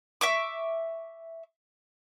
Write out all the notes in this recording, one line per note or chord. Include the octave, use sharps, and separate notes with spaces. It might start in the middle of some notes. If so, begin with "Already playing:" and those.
E5 C#6 D6